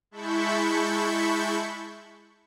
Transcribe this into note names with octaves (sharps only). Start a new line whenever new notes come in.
G#3 E4 A5 B5 C#6 G6